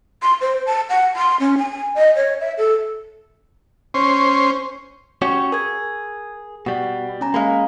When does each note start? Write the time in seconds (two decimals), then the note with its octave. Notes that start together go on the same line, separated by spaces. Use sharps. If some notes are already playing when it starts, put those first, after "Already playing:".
0.22 C6
0.41 C5
0.66 A5
0.90 F#5
1.16 C6
1.40 C#4
1.58 G#5
1.95 D#5
2.16 C#5
2.41 E5
2.58 A4
3.94 C#4 C5
5.22 C#4 F#4 G4 C#6
5.52 G#4 A#4 G#6
6.66 B2 G3 F#5
7.21 C#4 G#5 A#5
7.34 G#3 A#3 F5 A#5 B5